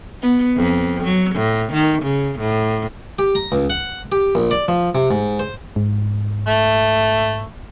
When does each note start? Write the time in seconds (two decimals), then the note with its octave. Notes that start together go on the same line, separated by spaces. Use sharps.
0.22 B3
0.56 F2
1.04 F#3
1.35 A2
1.73 D#3
2.03 C#3
2.40 A2
3.19 G4
3.35 A#5
3.52 C#2
3.70 F#5
4.12 G4
4.35 A#1
4.51 D5
4.68 F3
4.95 C3
5.11 G#2
5.39 C5
5.76 G#2
6.47 A3